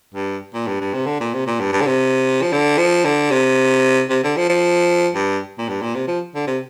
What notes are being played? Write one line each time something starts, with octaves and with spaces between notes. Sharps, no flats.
G2
A#2
G2
G2
C3
D3
A#2
C3
A#2
G2
G2
D3
C3
F3
D3
F3
D3
C3
C3
D3
F3
F3
G2
A#2
G2
A#2
C3
F3
D3
C3